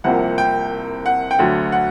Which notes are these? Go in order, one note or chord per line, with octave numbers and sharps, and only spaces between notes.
C2 C3 F3 A#3 F#5
G5
F#5
G5
D2 D3 F#3 F#5
F#5